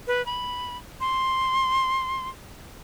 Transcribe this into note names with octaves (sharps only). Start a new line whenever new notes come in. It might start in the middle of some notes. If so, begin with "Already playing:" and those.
B4
B5
C6